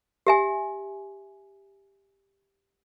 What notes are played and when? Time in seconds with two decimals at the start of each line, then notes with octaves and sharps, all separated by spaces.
0.27 G4 E5 G#5